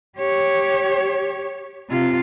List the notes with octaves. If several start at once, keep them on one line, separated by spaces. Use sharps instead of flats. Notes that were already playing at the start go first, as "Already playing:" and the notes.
G4 C#5
C3 F4